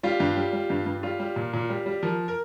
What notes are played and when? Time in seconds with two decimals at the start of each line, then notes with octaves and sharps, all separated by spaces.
0.03 G3 F4
0.20 G2
0.37 G3
0.53 G3
0.70 G2
0.86 G2
1.03 G3 F4
1.20 G3
1.36 A#2
1.53 A#2
1.70 G3
1.86 G3
2.02 F3 A#4
2.28 A#4